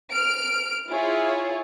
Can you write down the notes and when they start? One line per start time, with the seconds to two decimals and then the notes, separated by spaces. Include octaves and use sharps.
0.12 F6 D7
0.89 E4 F4 G#4 C#5